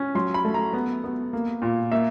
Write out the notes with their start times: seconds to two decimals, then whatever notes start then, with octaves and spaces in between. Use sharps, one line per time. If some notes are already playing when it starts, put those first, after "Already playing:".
Already playing: C#4
0.15 F#3 C6
0.34 B5
0.45 A3
0.54 A#5
0.74 B3
1.04 B3
1.33 A#3
1.62 A#2
1.92 A#3 E5